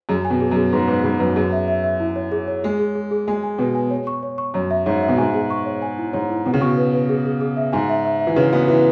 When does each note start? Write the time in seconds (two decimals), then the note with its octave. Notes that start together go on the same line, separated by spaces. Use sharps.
0.09 F#2 G#4
0.25 G#5
0.30 B2
0.41 G#4
0.51 F#2
0.56 G#4
0.73 G#2 B4
0.88 G#2 B4
1.04 G#2 B5
1.20 F#2 B4
1.36 F#2 G#4
1.52 E5
1.68 E5
1.84 E5
2.00 E4
2.16 C#5
2.32 G#4
2.48 C#5
2.64 G#3 G#4
2.79 G#4
2.95 G#4
3.11 G#4
3.27 G#3 G#5
3.43 G#5
3.59 B2 B4
3.75 G#5
3.90 C#5
4.07 C#6
4.23 C#5
4.38 C#6
4.54 F#2 C#5
4.71 E5
4.86 G#2 C#5
5.03 E5
5.08 B2
5.18 G#2 G#5
5.34 G#4
5.50 C#6
5.66 C#5
5.82 G#5
5.98 E4
6.13 G#2 C#5
6.30 E4
6.46 B2 F#5
6.54 C#3
6.61 B2 C#6
6.78 B4
6.94 B4
7.09 G#4
7.25 G#4
7.41 G#4
7.57 E5
7.72 G#2 G#5
7.89 E5
8.05 E5
8.20 E5
8.27 E3
8.36 C#3 B4
8.52 B3 F#4
8.68 E3 F#4